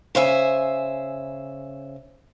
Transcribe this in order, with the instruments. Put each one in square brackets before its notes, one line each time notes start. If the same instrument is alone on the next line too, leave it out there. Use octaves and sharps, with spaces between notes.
[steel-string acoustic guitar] C#3 C5 E5 G#5